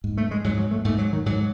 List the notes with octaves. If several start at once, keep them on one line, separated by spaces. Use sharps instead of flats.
G#2
A3
G#3
G#2 F#3
F#3
A3
G#2 A3
F#3
D#3
G#2 F#3